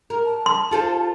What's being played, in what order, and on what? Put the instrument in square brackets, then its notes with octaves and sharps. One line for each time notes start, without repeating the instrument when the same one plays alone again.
[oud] A#4
[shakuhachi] A5
[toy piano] C6
[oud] F4 A4 C5